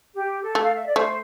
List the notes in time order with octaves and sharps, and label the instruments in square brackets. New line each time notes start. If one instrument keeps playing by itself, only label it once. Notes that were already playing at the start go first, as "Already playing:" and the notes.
[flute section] G4
A4
[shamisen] A3
[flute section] F5
E5
D5
[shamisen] A3 [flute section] C5